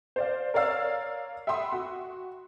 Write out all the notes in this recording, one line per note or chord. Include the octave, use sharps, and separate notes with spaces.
C5 D5 F5
A#4 C#5 D5 F5 E6 A6
E5 F#5 G5 B5 C6 D#6
F#4